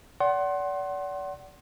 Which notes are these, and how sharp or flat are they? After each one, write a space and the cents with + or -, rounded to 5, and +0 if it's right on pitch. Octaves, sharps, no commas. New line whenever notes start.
D5 -35 F#5 +25 C6 +20